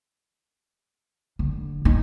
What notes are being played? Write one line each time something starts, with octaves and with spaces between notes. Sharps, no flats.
D3
D#4